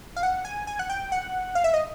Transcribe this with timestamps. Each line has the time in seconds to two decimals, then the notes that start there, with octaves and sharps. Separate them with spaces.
0.16 F5
0.23 F#5
0.45 G#5
0.67 G#5
0.79 F#5
0.90 G5
1.12 F#5
1.55 F5
1.64 E5
1.74 D#5